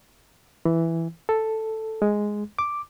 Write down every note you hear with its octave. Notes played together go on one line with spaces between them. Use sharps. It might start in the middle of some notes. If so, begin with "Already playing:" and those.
E3
A4
G#3
D6